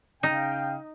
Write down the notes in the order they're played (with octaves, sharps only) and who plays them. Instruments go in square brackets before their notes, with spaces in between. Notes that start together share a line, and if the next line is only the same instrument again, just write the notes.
[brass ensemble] C#3 F5 G5 [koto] D#4